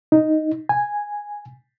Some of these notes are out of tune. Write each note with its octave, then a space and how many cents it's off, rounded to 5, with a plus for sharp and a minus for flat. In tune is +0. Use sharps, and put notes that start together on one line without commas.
D#4 +0
G#5 -5